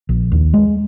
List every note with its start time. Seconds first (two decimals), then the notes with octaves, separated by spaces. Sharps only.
0.09 A#1
0.32 D#2
0.53 G#3